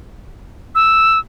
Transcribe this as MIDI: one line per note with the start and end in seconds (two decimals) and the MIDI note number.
0.75 1.19 88